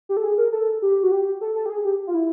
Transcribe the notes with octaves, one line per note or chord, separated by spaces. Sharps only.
G4
A4
G#4
A#4
A4
G4
F#4
G4
A4
A4
G4
G#4
G4
F4
E4